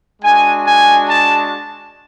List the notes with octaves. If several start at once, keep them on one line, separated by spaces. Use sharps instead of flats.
G#3 D4 F#4 G#5
G#5
A5